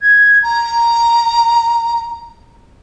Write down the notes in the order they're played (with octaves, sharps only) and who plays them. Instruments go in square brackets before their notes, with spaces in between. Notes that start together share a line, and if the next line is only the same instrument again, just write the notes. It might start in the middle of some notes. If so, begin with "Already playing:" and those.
[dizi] G#6
A#5